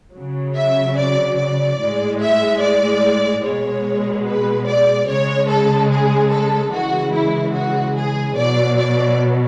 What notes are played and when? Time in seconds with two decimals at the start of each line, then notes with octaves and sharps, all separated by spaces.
0.14 C#3 F#3
0.55 E5
0.97 D5
1.37 D5
1.78 A2 G#3
2.20 E5
2.61 D5
3.43 B2 G#3 C#5
4.25 B4
4.67 D5
5.07 C#3 G#3 C#5
5.49 A4
5.91 G#4
6.31 A4
6.72 C#3 E3 G#3 F#4
7.13 E4
7.55 F#4
7.96 G#4
8.37 B2 F#3 D5
8.78 D5